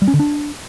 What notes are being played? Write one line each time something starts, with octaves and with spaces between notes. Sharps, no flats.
G3
C#4
D3
D4